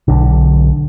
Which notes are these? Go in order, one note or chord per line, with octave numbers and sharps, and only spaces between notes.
B1 D3